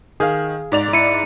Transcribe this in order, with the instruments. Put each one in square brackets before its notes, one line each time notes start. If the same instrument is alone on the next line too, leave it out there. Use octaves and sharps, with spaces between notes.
[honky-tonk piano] D#3 [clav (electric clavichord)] G#4 F5
[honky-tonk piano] G#2 D5 F7
[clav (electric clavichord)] E4 [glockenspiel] C#7 D#7